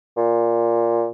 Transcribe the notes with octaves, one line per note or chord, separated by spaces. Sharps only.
A#2